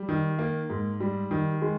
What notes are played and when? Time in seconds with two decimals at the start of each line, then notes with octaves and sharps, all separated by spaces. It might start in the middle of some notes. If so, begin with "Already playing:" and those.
Already playing: G3
0.09 D#3
0.39 A#3
0.70 G#2
1.00 G3
1.31 D#3
1.61 G#3